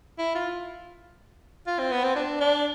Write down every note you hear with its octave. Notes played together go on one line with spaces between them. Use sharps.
E4
F4
F4
C4
B3
C4
D4
D4